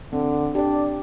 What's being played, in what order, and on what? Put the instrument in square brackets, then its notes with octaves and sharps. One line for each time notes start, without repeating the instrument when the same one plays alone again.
[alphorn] D3 [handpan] C4
[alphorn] D4 [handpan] G4 D5